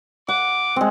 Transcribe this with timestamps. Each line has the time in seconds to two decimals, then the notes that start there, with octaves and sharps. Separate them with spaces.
0.28 F#5 D6
0.76 G#3 C4